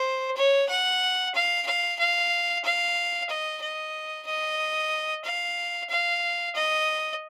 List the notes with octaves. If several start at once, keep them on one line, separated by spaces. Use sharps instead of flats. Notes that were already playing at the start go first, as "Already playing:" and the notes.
Already playing: C5
C#5
F#5
F5
F5
F5
F5
D#5
D#5
D#5
F5
F5
D#5